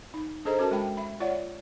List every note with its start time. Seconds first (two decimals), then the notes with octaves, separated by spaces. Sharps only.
0.14 D#4
0.45 D4 G#4 A4 C5 D#5 A#5
0.59 C#4 F#4 A4 A#4 A5
0.71 G#3 F#4 G5 B5
0.97 E5 B5
1.20 F4 C#5 D5 E5 F#5